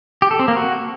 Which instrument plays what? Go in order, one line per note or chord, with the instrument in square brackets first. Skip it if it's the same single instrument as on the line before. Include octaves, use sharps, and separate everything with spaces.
[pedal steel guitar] G4
A4
C4
A#3
F#4